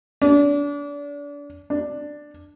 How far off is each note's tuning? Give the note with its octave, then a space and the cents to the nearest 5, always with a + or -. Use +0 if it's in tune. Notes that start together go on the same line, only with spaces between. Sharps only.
D4 -30
D4 +10